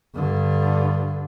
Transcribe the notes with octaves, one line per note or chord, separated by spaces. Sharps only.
G2 D3